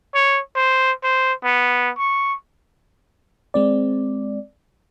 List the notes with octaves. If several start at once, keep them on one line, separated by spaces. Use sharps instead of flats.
C#5
C5
C5
B3
C#6
G#3 C4 D5